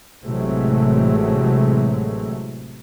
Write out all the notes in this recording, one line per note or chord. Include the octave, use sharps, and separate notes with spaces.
A1 C3 E3 F#3 G#3 A3